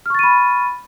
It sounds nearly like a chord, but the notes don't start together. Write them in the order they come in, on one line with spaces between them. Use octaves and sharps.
F6 C#6 A6 D#7 B5